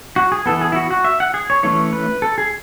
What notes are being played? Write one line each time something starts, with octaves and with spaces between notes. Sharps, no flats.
F#4
G#4
E3 B3 A4
G#4
E4
F#4
F#4
E5
F#5
G#4
C#5
E3 A3 C#4 C#5
B4
A4
G#4